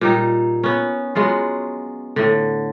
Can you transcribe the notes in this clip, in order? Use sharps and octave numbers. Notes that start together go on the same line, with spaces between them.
A#2 G3 D#4
B3 C#4
F#3 G#3 B3 F4
A2 D3